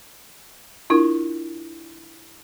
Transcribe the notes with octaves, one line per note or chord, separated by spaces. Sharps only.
D4 E4 F4 A#4